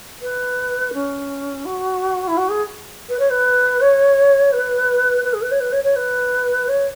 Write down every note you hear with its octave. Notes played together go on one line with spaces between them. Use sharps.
B4
C#4
F#4
E4
F#4
G#4
B4
C#5
B4
C#5
B4
B4
G#4
B4
C#5
B4
C#5
C#5
B4
C#5